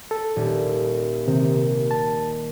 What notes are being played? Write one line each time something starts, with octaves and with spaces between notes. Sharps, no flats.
A4
D#1
C3 D#3
A5